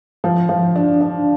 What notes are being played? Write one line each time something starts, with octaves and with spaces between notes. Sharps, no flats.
F3
F3
D4
D4